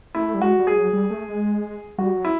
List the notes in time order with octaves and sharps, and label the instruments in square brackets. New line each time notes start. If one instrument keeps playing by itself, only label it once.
[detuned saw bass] A3 [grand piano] E4
[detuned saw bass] G3
[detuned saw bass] G#3 [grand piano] F#4
[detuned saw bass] G3
[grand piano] G#4
[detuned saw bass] F#3
G3
A3
G#3
[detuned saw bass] G3 [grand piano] F#4
[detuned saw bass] F#3
[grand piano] E4